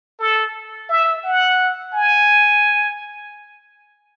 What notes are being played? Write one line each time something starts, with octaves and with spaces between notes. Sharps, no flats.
A4
E5
F#5
G#5